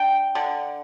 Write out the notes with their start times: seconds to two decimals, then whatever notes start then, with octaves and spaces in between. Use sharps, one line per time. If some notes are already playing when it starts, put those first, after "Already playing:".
Already playing: D4 G5
0.35 D3